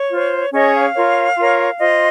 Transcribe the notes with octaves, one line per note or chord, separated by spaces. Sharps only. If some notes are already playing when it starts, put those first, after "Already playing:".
Already playing: C#5
F4 C5
C#4 G#4 C#5 D#5
F5
F4 A#4 C#5
F4 A#4 C#5
F4 C5 D#5